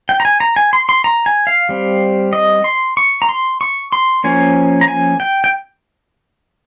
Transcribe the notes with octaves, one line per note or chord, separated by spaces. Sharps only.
G5
A#5
G#5
A#5
G#5
C6
C6
A#5
G#5
F5
G3 C4
D#5
C6
C#6
A#5
C6
C#6
C6
F3 A#3 C#4 G#5
A#5
G#5
G5
G5